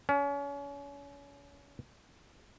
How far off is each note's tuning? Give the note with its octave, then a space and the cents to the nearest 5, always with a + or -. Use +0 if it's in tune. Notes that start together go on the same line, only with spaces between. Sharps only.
C#4 +35